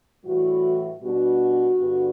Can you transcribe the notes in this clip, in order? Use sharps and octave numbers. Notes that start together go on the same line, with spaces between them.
A2 E3 G3 F#4
B2 G3 B3 D4 F#4
G2 D3 G3 B3